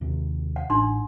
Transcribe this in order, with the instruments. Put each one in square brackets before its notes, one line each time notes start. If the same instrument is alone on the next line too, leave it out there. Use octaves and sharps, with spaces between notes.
[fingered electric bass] D#2 C3
[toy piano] F#5
[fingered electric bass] A1 [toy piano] D4 D#4 C6